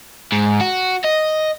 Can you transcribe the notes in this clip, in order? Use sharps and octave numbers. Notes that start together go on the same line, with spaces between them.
G#2
F#4
D#5